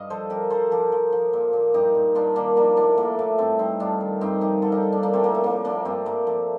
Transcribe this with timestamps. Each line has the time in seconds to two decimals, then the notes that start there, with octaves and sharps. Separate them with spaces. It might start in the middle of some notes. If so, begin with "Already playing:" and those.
Already playing: G2 D#5 F5
0.10 F3 A4 C5
0.30 F3 G4 A#4
0.50 F3 A4 C5
0.71 F3 G4 A#4
0.92 F3
1.12 F3
1.33 A#2
1.53 A#2
1.74 G2 D#4 G4
1.95 G2
2.15 G2 D4 F4
2.36 D#3 A#3 D4
2.56 F3 A#3 D4
2.76 A2 A#3 D4
2.97 A2 A#3
3.18 A2 A3
3.38 G2 A3 C4
3.59 G2 C4 D#4
3.80 G2 D4 F4
4.01 D#3
4.21 G2 C4 D#4
4.41 F3 D#4 G4
4.62 D3 F4 A4
4.72 D#4 G4
4.83 D3
4.92 A#3 D4
5.03 A2 A#3 D4
5.13 A3 C4
5.23 F3 A#3
5.35 A3
5.44 A2 A#3
5.65 F3 A#3 D4
5.85 G2 A3 C4
6.06 G2 A#3
6.27 F3 A3